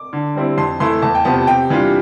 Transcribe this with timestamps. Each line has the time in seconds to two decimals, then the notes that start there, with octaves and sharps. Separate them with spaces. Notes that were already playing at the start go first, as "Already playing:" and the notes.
Already playing: D6
0.13 D3
0.35 G3 C4 E4
0.58 F2 C6
0.80 E3 A3 E4 C6
1.02 E2 A5
1.15 G5
1.25 C3 F3 B3 A5
1.47 C3 G5
1.70 E3 G3 D4 F4